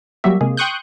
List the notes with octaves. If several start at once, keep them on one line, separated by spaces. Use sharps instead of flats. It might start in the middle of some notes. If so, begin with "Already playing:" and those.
F#3 G3 A#3 F#4 G4 E5
C3 G#3 A#3 G#4
G5 C6 C#6 D#6 F#6 G6